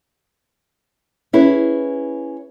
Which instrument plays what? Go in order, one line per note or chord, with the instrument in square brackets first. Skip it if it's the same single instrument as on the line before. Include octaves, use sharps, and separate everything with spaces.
[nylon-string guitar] C#4 E4 G#4 B4